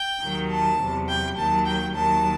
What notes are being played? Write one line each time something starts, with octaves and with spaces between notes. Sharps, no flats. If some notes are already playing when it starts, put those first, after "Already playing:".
Already playing: G5
D#2 D#3 F#3
A5
E2 C3 F#3
G5
D#2 D#3 F#3 A5
G5
D#2 D#3 F#3 A5